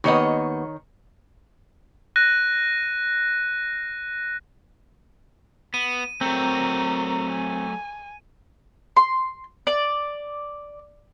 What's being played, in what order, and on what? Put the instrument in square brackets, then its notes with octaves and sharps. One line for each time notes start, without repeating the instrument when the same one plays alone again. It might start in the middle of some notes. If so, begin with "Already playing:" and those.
[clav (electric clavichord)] D#2 B3 [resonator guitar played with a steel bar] D#3 C#5 D#5
[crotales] F#6 A#6 D#7
[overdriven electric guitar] B3 [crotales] D#7
[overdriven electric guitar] F#3 A3 [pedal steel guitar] C4 [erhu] A#4
[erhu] G#5
[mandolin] C6
D5